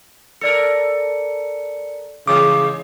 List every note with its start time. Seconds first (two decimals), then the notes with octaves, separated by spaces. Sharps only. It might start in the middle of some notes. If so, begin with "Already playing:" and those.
0.41 A4 A#4 D5 C#7
2.28 C#3 E3 G#3 D6